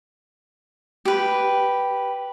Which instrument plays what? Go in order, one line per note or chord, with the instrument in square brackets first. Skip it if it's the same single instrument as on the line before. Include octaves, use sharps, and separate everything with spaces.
[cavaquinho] G4 B4